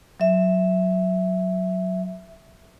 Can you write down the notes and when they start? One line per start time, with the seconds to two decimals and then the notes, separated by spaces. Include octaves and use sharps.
0.20 F#3 E5